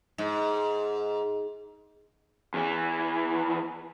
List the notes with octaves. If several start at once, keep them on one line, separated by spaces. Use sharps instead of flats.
G#2
E2 E3